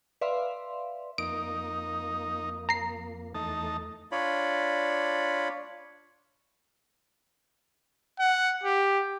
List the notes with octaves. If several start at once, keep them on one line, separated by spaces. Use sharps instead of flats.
B4 D5 E5 F5 C6
F2 A#3 D#4 D7
A#5 C7
E2 A3 D#4 A5
D4 F4 C#5 D5 B5
F#5
G4